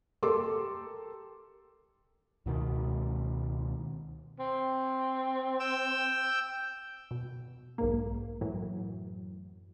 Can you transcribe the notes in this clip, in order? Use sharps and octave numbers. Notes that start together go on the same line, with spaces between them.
G4 A4 A#4 C6 D6 E6
C#2 B2 D#3
C4
G5 E6
B2
B1 G#2 A#3
F#2 A2 E3 F#3